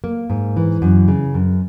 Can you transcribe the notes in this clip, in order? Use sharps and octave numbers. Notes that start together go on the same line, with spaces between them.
A#3
G#2
E3
F#2
C#3
F#2